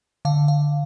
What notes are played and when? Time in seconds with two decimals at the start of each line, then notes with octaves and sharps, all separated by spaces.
0.25 D3 F5
0.48 F5